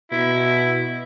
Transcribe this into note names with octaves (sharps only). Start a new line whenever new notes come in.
B2 E4